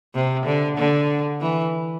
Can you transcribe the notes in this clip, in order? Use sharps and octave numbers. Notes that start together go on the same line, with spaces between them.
C3
D3
D3
E3